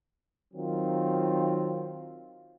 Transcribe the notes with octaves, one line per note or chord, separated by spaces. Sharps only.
D#3 F#3 C4 F4